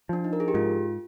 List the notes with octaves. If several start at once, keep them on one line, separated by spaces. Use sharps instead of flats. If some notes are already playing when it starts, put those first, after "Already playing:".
F3 D4
D#4
A#4
G#4
G4
G#2 F4